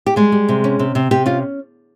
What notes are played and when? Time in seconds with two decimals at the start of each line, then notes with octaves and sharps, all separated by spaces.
0.06 G4
0.16 G3 G#3 G#4
0.32 G3
0.48 C3
0.64 C#4
0.79 C3
0.95 C3
1.11 C3 G4
1.26 C#4 F4